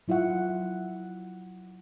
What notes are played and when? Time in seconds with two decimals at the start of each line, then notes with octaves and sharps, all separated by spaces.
0.08 F#3 E4 F4 E5 F#5